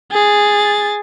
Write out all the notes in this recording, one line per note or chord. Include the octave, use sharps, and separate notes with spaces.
G#4 A6